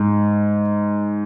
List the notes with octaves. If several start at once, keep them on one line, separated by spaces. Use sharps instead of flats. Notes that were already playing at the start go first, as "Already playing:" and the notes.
Already playing: G#2